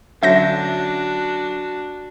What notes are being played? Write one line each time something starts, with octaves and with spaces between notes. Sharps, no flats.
D3 F#3 C#4 D4 F#4 E5 G6 A#6